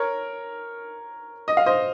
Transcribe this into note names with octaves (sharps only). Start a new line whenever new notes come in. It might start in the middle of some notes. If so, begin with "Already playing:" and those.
Already playing: A#4 C#5
D#5
F5
C5 D#5